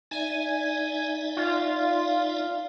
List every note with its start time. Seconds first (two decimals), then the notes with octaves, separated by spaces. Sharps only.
0.11 D#4 D5 E5 G#5
1.37 F4